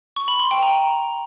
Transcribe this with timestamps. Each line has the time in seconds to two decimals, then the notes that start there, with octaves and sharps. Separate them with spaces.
0.16 C#6
0.28 B5
0.40 C6
0.51 G5
0.63 A#5